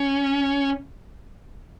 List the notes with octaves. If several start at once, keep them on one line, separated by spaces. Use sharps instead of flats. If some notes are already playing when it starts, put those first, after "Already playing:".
Already playing: C#4